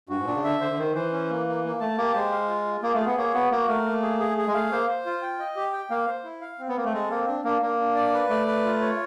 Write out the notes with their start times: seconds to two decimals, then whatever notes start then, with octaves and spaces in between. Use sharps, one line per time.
0.09 G2 F#4
0.18 G#2
0.26 A#2 D4
0.35 C#3
0.44 D3 E5
0.61 D3 C5
0.71 D3
0.78 D#3 C5
0.95 E3 C5
1.12 C#4
1.29 A#3
1.47 A#3
1.64 A#3
1.80 A3 A5
1.97 A#3 G4
2.14 G#3 C5
2.32 F5
2.48 F4
2.65 F4
2.82 A#3 G#4
2.95 A3
3.00 G#4
3.06 B3
3.17 A#3 C#5
3.34 B3 F#4
3.52 A#3 F#4
3.68 A3 A#4
3.86 A#3
4.02 G#4
4.20 G#4
4.37 G#4
4.47 G#3
4.54 A3 F5
4.71 A#3 C5
4.89 C5
5.06 F4
5.22 G5
5.39 D#5
5.56 G4
5.73 G5
5.90 A#3 F5
6.08 C5
6.24 E4
6.41 F5
6.59 C4
6.68 B3
6.76 A#3 C4
6.85 A3
6.93 G#3 A4
7.10 A#3 C4
7.28 D4
7.44 A#3 D4
7.61 A#3 D4
7.79 D4
7.95 D5
8.13 B4
8.29 A3 D5
8.47 B4
8.65 F4
8.81 C#5